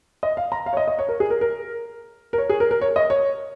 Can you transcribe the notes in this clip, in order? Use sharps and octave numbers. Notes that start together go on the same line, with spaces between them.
D#5
F5
A#5
F5
C#5
D#5
D#5
C#5
A#4
G#4
A#4
A#4
A#4
C#5
G#4
A#4
A#4
C#5
D#5
C#5